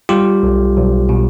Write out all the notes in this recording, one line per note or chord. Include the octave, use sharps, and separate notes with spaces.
G3 F4 G4
B1
B1
B2